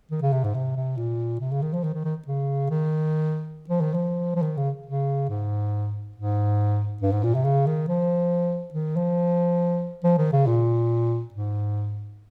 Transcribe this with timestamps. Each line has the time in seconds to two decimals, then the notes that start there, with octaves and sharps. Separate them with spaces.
0.11 D#3
0.22 C#3
0.33 C3
0.44 G#2
0.55 C3
0.77 C3
0.97 A#2
1.40 C3
1.52 C#3
1.62 D#3
1.73 F3
1.84 D#3
1.94 D#3
2.05 D#3
2.28 C#3
2.71 D#3
3.70 F3
3.81 D#3
3.94 F3
4.36 F3
4.42 D#3
4.57 C#3
4.86 C#3
5.29 G#2
6.16 G#2
7.02 G2
7.12 G#2
7.24 A#2
7.35 C3
7.44 C#3
7.67 D#3
7.89 F3
8.74 D#3
8.97 F3
10.04 F3
10.19 D#3
10.33 C#3
10.47 A#2
11.34 G#2